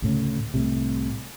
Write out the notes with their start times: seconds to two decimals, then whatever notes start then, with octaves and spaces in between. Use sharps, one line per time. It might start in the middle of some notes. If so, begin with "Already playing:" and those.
0.02 D2 A2 C#3
0.54 C2 A2 C3